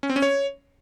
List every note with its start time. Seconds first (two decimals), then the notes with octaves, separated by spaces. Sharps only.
0.03 C#4
0.09 C4
0.16 C#4
0.22 C#5